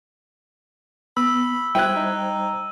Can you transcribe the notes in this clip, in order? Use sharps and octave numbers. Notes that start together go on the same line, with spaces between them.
B3 B5 E6
G3 E4 C5 G5 F#6 G#6 D#7
D#4